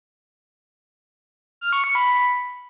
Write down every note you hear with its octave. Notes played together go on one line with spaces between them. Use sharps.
F6
C#6
C#7
B5